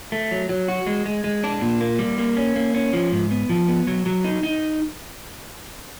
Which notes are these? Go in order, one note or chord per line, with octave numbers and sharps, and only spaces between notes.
A3
F#3
F#3
F#4
G#3
G#3
G#3
D4
A#2
A#3
G3
A#3
C#4
A#3
C#4
F3
G#2
B3
F3
B3
F#3
F#3
D#4
D#4